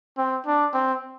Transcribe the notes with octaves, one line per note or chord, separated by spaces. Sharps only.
C4
D4
C4